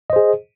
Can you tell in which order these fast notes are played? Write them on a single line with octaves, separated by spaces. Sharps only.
D#5 C5 G#4